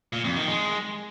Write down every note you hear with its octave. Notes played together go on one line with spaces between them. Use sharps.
A#2
F2
D#3
G#3